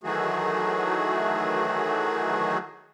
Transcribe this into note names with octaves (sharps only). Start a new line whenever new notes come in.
D#3 E3 F#3 A3 F#4 G#4